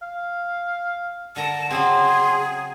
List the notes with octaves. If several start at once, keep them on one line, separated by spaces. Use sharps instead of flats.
F5
D3 A#4 A5 A#5
C#3 F#3 C4 G#4 C6